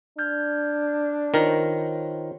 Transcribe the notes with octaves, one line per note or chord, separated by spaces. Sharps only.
D4 F6 G6 G#6
D#3 F4 A#4 C5 C#5